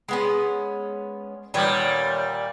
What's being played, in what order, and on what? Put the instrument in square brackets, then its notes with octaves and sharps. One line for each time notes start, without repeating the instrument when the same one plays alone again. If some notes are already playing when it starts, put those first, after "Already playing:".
[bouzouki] G#3 B3 C#4
[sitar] A#2 G3 [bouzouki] D#3 B3 C#5